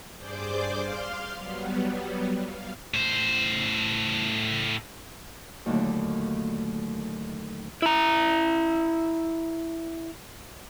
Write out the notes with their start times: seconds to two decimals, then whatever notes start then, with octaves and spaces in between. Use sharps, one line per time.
0.16 G2 G#4 C5 D5 D6 G6
0.77 F5 C6 F6
1.35 F#3 G3 B3
2.43 F5
2.94 A2 C5
5.66 D#2 A#2 D3 F#3 A3
7.82 E4 A#5